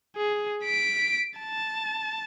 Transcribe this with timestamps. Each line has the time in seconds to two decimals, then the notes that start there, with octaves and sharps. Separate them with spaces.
0.16 G#4
0.64 B6 D7
1.38 A5